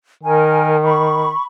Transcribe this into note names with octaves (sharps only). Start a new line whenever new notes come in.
D#3 A#4 G#5
B5 C#6